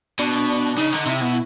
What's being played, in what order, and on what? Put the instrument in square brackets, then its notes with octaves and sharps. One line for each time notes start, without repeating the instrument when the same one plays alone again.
[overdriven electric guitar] B2 [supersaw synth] D4
[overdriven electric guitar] C#3 [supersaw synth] D#4
[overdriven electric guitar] D3
[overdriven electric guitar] C3 [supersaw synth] E4
[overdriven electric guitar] B2